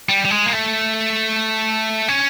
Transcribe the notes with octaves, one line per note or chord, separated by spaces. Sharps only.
G3
G3
G#3
A#3
A3
C#4